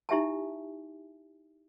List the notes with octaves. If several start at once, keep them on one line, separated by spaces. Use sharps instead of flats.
D#4 E4 G4 E5 G#5 A5